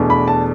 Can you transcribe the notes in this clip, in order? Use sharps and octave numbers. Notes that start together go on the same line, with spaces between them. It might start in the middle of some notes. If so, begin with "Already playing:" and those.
Already playing: E2 B2 A3 D4
B5
A5